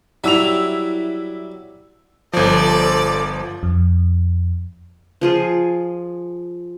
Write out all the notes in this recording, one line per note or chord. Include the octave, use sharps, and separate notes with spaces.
F#3 G3 E4 E6 F7
G1 F3 A4 D5
F2
F3 F4 G#4